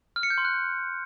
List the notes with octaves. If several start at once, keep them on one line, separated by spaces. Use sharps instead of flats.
F6
C#7
G6
C6
F#6